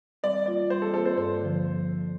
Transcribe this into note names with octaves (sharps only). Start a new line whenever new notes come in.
G3 D5
A#3 F4 D5
G3 C5
A4
A#3 F4 A4
C5
G2 C5
D3 F3